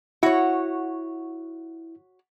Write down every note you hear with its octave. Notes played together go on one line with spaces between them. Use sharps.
E4 F#4 C#5